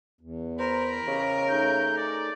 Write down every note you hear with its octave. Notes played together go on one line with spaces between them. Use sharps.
E2
A#4 C5 B5
C#3 G4 C#5 D#5
A3 D#4 G#4 G6
D5